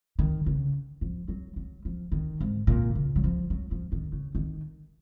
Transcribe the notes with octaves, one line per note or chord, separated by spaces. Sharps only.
D#3
C#3
F3
F#3
F#3
F3
D#3
G#2
A#2
C#3
F#3
F3
F#3
F3
D#3
C#3
D#3